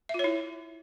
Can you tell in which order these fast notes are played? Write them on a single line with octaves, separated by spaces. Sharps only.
E5 F4 C#5 E4